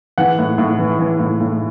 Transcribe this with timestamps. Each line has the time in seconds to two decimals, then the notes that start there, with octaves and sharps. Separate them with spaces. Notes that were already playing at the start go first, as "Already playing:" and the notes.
0.18 E3 F#5
0.39 A2
0.58 A2
0.79 E3
0.99 E3
1.19 A2
1.40 A2